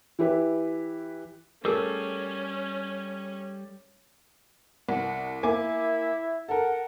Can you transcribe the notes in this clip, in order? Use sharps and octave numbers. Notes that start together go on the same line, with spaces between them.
E3 E4 G4 B4
G3 A3 C#4 G#4 A#4
C2 F#5
A#3 E4 G#5 D6
A4 A#4 F#5